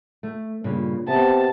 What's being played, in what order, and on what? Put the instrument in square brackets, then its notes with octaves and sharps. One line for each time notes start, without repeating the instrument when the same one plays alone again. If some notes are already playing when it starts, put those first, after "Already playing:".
[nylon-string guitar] A3
G2 A#2 C#3
[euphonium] C3 [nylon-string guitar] B3 [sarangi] A5